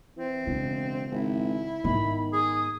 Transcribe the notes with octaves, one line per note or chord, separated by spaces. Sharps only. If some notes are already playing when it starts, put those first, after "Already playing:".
E3 C4
E1 C#3
G#1 E4
G#2 D#3 B3 B5
G#4 D#6